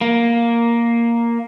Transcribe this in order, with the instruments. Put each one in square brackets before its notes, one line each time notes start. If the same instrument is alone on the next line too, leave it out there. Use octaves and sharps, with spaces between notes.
[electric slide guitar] A#3